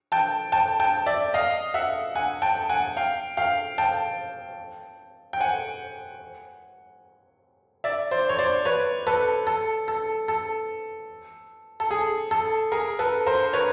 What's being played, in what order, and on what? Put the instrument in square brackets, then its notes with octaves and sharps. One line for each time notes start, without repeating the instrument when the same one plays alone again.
[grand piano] G5 A5
G5 A5
G5 A5
D5 E5
D#5 F5
E5 F#5
F#5 G#5
G5 A5
F#5 G#5
F5 G5
F5 G5
G5 A5
G5
F#5 G#5
D5 E5
C5 D5
C#5
C5 D5
B4 C#5
A4 B4
A4
A4
A4
A4
G#4
A4
G#4 A#4
A4 B4
A#4 C5
B4 C#5